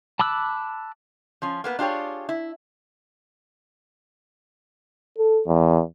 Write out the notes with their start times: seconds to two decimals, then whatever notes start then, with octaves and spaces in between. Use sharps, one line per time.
0.20 A5 B5 D6 E6 F#6
1.42 F3 C#4 F4
1.64 A#3 B3 B4
1.79 D4 F4 G4 G#4 C#5
2.29 E4
5.18 A4
5.47 E2